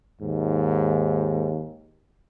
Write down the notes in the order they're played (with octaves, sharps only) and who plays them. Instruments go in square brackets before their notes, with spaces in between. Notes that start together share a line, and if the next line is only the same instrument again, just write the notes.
[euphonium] D#2 [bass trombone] G#2